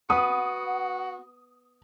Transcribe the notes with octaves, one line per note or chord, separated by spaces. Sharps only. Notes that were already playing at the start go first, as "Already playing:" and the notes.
B3 F#4 F#5 D#6